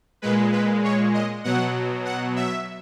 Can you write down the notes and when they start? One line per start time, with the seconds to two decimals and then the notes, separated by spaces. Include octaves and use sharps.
0.22 A#2 G#3 B4
0.52 B4
0.84 C#5
1.14 D#5
1.44 B2 F#3 F#5
2.05 F#5
2.36 E5